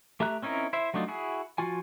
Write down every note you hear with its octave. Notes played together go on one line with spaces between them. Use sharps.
A3 G4 E5 A#5 F#6
C4 C#4 D#4 E4 A#4
E4 C5 E5
F#3 A3 D4 D#4 F4
E4 F#4 G#4
F3 F4 F#4 G#5